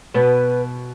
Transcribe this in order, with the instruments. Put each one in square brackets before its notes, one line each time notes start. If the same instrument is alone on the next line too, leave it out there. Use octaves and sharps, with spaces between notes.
[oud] B2 B3 [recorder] B4